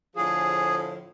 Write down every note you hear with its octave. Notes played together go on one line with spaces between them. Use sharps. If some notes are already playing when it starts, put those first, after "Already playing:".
A2 D3 F3 G#4